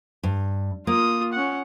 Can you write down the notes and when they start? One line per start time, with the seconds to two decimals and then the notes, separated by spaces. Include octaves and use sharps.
0.23 G2
0.87 A#3 F4 D#6
1.33 C#4 F#5